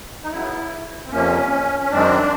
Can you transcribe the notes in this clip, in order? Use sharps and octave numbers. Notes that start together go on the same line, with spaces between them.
D#4
C#3 F#3 B3 E4
C4
F2 C3 F3 A#3 C#4
C#4
F#2 D#3 G#3 C4 D4